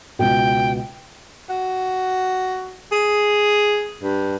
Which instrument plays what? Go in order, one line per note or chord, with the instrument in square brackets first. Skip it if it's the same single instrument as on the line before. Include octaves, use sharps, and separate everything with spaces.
[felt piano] C#2 B2 [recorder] G5
[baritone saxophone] F#4
G#4
G2